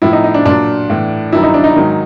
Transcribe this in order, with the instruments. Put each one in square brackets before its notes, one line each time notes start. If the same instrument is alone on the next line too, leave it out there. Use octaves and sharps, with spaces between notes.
[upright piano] A2 F3 E4
D#4
D#4
D4
A#2 F#3 D4
A2 E3
G2 D#3 F#3 E4
D#4
D4
D#4
G#2 D#3 F#3